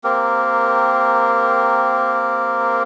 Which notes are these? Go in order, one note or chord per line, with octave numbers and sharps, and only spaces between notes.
A#3 C4 G4 A#4